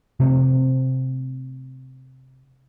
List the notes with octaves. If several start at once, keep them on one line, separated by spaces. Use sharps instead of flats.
C3 A3 C4